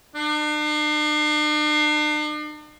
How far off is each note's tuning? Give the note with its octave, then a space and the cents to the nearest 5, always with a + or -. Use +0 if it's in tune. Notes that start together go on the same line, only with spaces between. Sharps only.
D4 +45